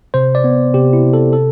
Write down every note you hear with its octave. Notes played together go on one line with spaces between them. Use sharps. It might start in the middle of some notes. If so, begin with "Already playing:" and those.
C3 C5
D5
B3
C3 G4
E4
C3
A4
A4